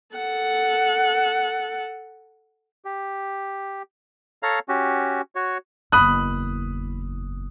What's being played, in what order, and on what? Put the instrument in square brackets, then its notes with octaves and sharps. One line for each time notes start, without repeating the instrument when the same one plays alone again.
[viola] A4 F#5
[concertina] G4
A4 C#5 F5 A#5
C#4 F#4 G4
F#4 C#5
[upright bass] F#1 E2 [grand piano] B5 D#6 F#6